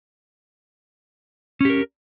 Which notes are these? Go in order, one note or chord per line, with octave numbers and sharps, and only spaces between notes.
C#4 G4 A#4